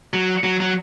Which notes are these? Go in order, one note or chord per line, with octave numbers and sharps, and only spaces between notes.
F#3
F#3
F#3